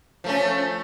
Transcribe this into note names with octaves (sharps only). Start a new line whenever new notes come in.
F3 A3 C#4